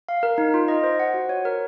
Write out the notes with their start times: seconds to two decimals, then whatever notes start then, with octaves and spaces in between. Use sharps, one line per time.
0.09 F5
0.23 A#4
0.38 D#4
0.54 F4
0.68 D#5
0.84 C5
0.99 F#5
1.14 F#4
1.29 C#5
1.45 A#4